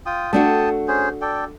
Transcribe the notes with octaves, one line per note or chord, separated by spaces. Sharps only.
F4 G5 D#6
A3 D4 F#4 G5 A5 D#6
C#4 G#4 C5
A4 D5 G5